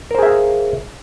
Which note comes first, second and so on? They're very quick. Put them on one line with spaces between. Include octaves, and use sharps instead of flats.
A#4 C5 G#4 E5 F5